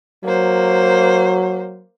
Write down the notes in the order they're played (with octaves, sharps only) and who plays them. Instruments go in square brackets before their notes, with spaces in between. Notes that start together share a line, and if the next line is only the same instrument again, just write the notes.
[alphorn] F#3 [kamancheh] A#3 C5